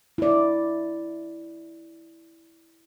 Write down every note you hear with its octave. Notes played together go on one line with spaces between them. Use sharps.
E4 D5